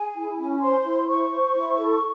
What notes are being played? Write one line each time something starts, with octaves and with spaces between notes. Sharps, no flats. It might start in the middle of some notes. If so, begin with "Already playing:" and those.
Already playing: G#4 G#5
E4
C#4
C5 C6
E4
C5 C#6
C5
E4
A4